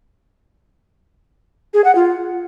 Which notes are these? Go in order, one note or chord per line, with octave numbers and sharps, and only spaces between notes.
G#4
F#5
F4